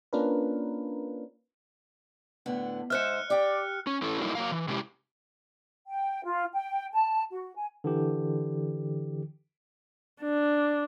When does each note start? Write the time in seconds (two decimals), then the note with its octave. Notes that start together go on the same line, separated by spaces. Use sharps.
0.13 A#3 C#4 D4 F4 A#4 B4
2.46 A2 D3 B3
2.90 G#2 C5 E5 F6 F#6 C#7
3.30 G4 D5 G5
3.87 C#4
4.02 A3 C#4 E4 A4
4.19 F#3 G3 A#3 D#4 E4
4.35 F#3 A#3 A#4 F5
4.51 E3
4.68 C3 G#3 C#4 E4 G4
5.87 G5
6.24 F4
6.53 G5
6.93 A5
7.32 F#4
7.56 G#5
7.84 D3 E3 G4
10.22 D4